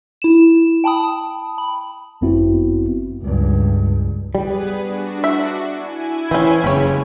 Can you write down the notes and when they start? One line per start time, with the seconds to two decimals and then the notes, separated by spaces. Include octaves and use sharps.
0.22 E4 E7
0.84 G5 A5 B5 D#6
1.58 B5
2.21 G1 F#2 B3 C4 E4 F#4
3.23 C#2 G2
4.35 G3 B3 G#4 B4
4.77 D4 F#4
5.24 E5
5.74 E4 G#5
6.31 E3 C4 C#4
6.64 F#1 A#2 C#3 E3 G3 G#3 C#5